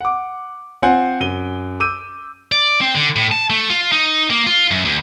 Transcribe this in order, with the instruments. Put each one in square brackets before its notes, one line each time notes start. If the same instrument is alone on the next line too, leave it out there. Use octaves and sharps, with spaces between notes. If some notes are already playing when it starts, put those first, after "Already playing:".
[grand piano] F#5 D6
C4 F4 C5 F#5 G#5
F#2 D#7 G7
D6 E6 G6 D#7
[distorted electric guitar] D5
C4
D3
A2
A5
A3
F4
D#4
A#3
F4
F#2
D2